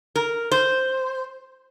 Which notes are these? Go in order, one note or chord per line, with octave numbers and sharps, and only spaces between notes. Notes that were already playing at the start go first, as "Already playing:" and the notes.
A#4
C5